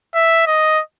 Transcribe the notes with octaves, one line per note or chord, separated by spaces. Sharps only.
E5
D#5